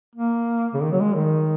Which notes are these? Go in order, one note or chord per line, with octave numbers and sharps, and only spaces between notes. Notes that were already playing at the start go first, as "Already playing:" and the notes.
A#3
C#3
D#3
F#3
G#3
D#3